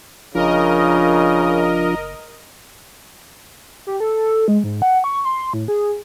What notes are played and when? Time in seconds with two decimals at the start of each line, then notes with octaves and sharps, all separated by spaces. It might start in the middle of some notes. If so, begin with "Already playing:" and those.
0.35 F#1 C#3 F3 D4 F4 A#4 D#5
3.87 G4
4.00 A4
4.48 G#3
4.64 G#2
4.82 F#5
5.04 C#6
5.25 C6
5.53 A2
5.68 G#4